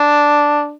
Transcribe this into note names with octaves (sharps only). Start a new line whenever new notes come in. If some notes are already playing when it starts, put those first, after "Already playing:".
Already playing: D4